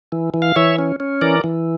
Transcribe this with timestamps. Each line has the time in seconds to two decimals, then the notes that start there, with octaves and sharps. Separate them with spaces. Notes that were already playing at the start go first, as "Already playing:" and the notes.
0.12 E3
0.34 E3
0.42 F5
0.56 E3 C#5 E5
0.79 C#4
1.00 C#4
1.21 E3 A#4 D5
1.44 E3